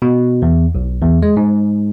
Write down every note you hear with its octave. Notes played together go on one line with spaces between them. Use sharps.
B2
E2
B1
E2
G#3
G#2